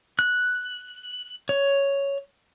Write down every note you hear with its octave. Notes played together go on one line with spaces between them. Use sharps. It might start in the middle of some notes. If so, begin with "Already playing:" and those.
F#6
C#5